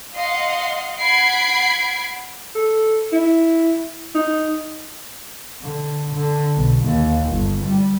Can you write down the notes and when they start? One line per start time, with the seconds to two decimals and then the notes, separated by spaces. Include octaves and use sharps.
0.15 D#5 F5 F#5 C6
1.00 F#5 B5 G#6 C7 D7
2.55 A4
3.12 E4
4.15 D#4
5.61 D3
6.14 D3
6.55 B1
6.84 D#2
7.31 G1
7.65 G3